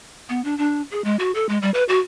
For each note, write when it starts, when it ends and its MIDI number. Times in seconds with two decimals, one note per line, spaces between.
0.29 0.43 59
0.44 0.57 62
0.58 0.82 62
0.91 1.04 68
1.04 1.16 56
1.19 1.32 66
1.35 1.46 69
1.49 1.58 56
1.62 1.70 55
1.74 1.84 71
1.89 1.99 66